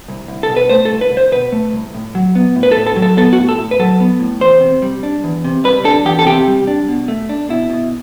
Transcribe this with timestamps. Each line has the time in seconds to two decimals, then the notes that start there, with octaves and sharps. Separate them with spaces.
0.08 C2
0.28 C2
0.43 A4
0.49 B2
0.56 B4
0.69 A3 C5
0.85 A4
0.90 C2
1.01 B4
1.11 C2
1.17 C5
1.32 B2 B4
1.52 A3
1.73 C2
1.94 A2
2.15 F#3
2.35 B3
2.56 A2
2.63 B4
2.72 A4
2.77 A2
2.87 A4
2.96 F#3
3.02 A4
3.17 B3 A4
3.33 F#4
3.38 A2
3.49 A4
3.59 A2
3.71 B4
3.79 F#3 A4
4.00 B3
4.20 A2
4.40 E2 C5
4.61 C3
4.82 G3
5.03 D4
5.24 E2
5.44 C3
5.64 G3 B4
5.84 D4 A4
6.05 E2 G4
6.19 A4
6.26 C3 G4
6.47 G3
6.67 D4
6.88 B2
7.08 A3
7.29 D4
7.49 B2 E4
7.70 B2